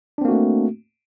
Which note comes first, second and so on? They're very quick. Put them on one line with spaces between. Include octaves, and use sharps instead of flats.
D4 C4 A#3 F#4 A3